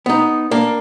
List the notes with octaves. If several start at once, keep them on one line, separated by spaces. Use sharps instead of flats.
B3 D#4
A#3 D4